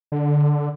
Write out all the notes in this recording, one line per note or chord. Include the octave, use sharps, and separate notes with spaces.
D3